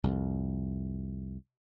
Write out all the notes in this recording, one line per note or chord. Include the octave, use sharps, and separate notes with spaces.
C2 F2